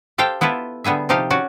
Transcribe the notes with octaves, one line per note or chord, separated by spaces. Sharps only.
G4 A4 C5 F5 G5
B3 E4 F4 A4 B4 E5
D3 G3 B3 G#4 E5
C3 F3 D#4 G4 A4 F5
C#4 F#4 D5